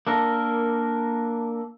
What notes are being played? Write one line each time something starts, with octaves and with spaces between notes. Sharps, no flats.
A#3 D4 A4 A#4